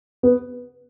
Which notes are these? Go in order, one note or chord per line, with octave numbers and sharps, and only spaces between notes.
B3